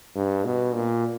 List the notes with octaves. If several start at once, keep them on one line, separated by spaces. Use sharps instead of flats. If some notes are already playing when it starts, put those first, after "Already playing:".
G2
B2
A#2